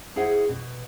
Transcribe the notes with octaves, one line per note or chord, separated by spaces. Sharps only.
E4 G#4 C5 E5 F#5
B2